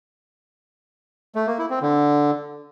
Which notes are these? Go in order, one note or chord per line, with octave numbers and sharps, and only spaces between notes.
A3
A#3
E4
C4
D3